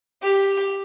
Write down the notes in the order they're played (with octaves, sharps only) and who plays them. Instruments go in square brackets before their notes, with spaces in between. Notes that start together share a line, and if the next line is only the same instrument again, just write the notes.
[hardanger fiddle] G4